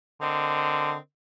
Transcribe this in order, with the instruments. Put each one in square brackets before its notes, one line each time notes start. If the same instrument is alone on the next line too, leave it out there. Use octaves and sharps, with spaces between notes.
[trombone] D3 [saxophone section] C4 A#4 D#5